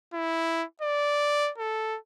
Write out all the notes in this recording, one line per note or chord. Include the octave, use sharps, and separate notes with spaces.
E4
D5
A4